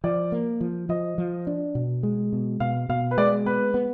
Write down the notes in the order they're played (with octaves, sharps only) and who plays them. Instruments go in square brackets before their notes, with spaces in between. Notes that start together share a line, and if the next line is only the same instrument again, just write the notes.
[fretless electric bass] F3 [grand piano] D5
[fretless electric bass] A#3
F3
[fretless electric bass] F3 [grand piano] D#5
[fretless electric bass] F3
D4
B2
G#3
B2
[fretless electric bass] B2 [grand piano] F5
[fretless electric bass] B2 [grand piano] F5
[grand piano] B4
[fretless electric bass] G#3 [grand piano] D5
[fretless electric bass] B3 [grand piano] B4
[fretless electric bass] B3